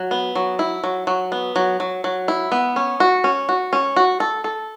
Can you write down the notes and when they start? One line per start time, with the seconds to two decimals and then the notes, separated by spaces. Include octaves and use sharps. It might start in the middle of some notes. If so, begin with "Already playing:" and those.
Already playing: F#3
0.11 B3
0.35 F#3
0.59 E4
0.84 F#3
1.07 F#3
1.32 B3
1.56 F#3
1.80 F#3
2.04 F#3
2.28 E4
2.52 B3
2.76 C#4
3.00 F#4
3.24 C#4
3.49 F#4
3.73 C#4
3.96 F#4
4.20 A4
4.44 A4